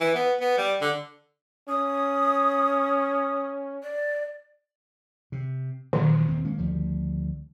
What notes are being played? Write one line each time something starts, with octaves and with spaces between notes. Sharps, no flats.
E3
B3
B3
G3
D3
C#4 D#6
D5
C3
A#2 D#3 E3 F#3
D#1 C4
G#3 A#3 C#4
D2 F3 G3